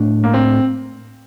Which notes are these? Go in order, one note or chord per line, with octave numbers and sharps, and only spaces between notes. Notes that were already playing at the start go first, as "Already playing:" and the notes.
Already playing: A2 A3 D4
A#3
C4